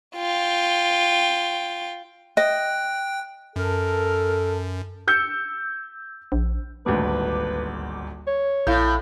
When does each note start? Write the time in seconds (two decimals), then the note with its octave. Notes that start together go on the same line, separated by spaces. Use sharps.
0.16 F4 G5
2.37 D#5 G5 F#6
3.56 F#2 A4 A#4
5.07 E6 G6 C#7
6.32 A#1
6.86 D#1 G#1 D2 B4 D6
8.27 C#5
8.67 A#1 A2 F5 G6